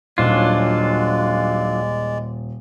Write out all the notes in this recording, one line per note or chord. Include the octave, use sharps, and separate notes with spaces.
D#1 F#3 G#3 D4 F4 D5